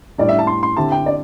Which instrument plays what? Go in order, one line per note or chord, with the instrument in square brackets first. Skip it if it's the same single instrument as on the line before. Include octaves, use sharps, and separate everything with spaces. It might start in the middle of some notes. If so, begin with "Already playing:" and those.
[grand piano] A2 G3 D4 [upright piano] D5
[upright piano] E5
A5
C6
C6
[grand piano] D3 C4 E4 G4 [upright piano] A5
[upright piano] G5
D5